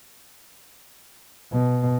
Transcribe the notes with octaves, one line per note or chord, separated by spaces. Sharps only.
B2